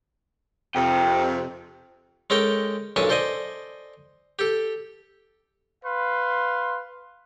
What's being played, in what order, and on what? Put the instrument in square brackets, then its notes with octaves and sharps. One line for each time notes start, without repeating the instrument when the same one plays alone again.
[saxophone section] F2 C3 [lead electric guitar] D#5 G5
[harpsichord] G#3 C#4 A4 A#4 G5
B1 A#2 C#4 D4 A4 G#5
A4 C5 D5 D#5 G#5
G4 A4
[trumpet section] B4 F5 C6